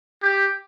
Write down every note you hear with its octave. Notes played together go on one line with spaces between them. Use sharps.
G4